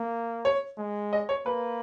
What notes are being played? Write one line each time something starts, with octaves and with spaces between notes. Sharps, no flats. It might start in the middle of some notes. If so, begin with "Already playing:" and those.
Already playing: A#3
C#5
G#3
D#5
C#5
A#3 B4